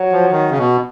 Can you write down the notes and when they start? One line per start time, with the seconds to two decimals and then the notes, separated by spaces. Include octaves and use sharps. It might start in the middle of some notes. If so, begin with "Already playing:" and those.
Already playing: F#3
0.12 F3
0.32 D#3
0.50 C#3
0.58 B2